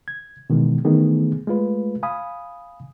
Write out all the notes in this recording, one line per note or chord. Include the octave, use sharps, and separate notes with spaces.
G#6
B2 D#3 E3 G#3
D#3 E3 A3 B3 D#4 G#4
G#3 A3 F4 B4
F5 G#5 B5 D#6